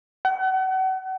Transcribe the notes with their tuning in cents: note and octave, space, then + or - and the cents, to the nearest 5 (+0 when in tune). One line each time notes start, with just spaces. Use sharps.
F#5 +35